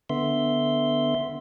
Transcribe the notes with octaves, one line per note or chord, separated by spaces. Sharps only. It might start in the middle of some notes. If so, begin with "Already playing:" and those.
D3 B3 E5 C6